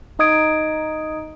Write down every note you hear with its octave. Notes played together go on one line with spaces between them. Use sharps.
D#4 D#5 D#6 G#6 D7